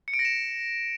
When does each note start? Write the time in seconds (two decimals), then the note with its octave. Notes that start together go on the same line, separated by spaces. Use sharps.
0.08 C#7
0.13 D7
0.19 A#6
0.25 E7